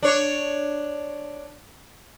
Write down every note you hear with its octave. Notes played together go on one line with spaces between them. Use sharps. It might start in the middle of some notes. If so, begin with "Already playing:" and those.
D4 C#5